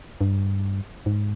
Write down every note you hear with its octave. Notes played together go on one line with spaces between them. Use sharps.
G2
G#2